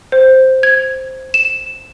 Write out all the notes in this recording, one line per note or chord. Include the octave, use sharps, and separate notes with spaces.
C5
G#6
E7